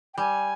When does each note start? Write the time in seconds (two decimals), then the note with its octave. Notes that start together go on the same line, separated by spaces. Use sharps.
0.14 G5
0.18 G3 G#5